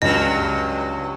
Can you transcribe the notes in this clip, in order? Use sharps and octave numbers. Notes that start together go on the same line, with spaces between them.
C#2 G2 F#3 D#5